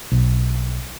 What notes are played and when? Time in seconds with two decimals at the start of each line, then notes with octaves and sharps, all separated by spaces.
0.12 B1